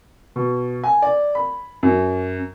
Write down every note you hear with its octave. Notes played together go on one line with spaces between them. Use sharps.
B2
G#5
D5
B5
F#2